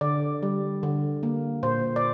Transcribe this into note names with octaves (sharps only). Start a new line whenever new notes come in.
D3 D5
G3
D3
A#3
A#2 C5
D5